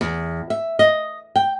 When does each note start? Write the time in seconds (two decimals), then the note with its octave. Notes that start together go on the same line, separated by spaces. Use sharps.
0.01 E2
0.50 E5
0.79 D#5
1.36 G5